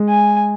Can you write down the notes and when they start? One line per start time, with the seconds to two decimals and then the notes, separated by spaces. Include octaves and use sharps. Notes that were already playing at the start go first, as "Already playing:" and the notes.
Already playing: G#3
0.09 G#5